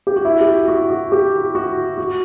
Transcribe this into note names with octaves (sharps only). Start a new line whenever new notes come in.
G4
F#4
E4
G4
F#4
F#4
F#4
G4
F#4
F#4